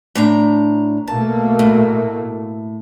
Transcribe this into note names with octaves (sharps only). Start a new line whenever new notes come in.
A2 D4 A#5
B2 A3 A#3 A5
A2